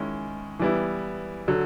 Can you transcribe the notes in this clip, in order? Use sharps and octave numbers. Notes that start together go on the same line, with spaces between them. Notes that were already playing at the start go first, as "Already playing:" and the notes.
Already playing: D#3 G#3 C#4 E4
E3 G3 B3 E4
D3 F#3